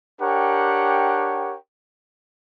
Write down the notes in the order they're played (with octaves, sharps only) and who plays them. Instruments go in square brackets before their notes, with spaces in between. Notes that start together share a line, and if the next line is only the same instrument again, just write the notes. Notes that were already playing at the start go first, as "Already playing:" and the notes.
[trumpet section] D4 G4 A#4 C#5 F#5 G5